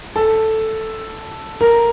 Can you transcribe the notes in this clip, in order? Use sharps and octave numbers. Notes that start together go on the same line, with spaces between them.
A4
A#4